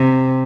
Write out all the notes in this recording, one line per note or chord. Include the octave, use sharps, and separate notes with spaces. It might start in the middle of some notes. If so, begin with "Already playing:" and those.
Already playing: C3